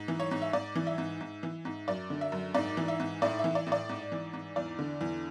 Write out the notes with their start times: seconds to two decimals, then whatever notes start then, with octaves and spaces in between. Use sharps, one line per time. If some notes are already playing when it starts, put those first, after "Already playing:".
Already playing: G#2
0.08 E3
0.20 C#5
0.31 G#2
0.42 E5
0.53 G#2 D5
0.76 E3
0.87 E5
0.98 G#2
1.21 G#2
1.43 E3
1.65 G#2
1.88 F#2 D5
2.10 D3
2.21 E5
2.32 F#2
2.54 G#2 D5
2.77 E3
2.88 E5
3.00 G#2
3.22 A2 D5
3.39 E5
3.44 E3
3.55 D5
3.67 A2
3.72 D5
3.89 G#2
4.12 E3
4.33 G#2
4.56 E2 D5
4.79 D3
5.01 E2